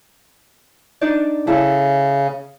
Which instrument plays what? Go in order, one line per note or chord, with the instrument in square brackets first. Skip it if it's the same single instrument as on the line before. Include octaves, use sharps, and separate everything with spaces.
[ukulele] D4 D#4 D5
[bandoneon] C#3 [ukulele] E4 A4